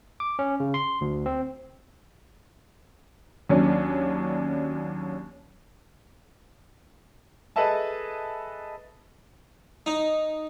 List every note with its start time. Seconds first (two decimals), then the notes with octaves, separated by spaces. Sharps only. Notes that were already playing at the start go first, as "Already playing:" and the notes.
0.20 D6
0.39 C#4
0.60 C#3
0.74 C6
1.01 D2
1.26 C4
3.49 D#2 F#3 C#4 D4
7.56 G#4 A4 B4 D#5 E5 A5
9.86 D#4